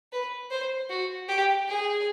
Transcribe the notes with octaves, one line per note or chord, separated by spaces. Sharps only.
B4
C5
F#4
G4
G#4